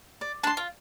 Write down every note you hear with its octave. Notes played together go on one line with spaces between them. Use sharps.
D5
D4 A5 C6
F4